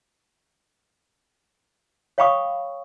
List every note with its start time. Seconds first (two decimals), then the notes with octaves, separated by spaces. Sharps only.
2.18 C#5 F5 G5 B5 C#6 D#6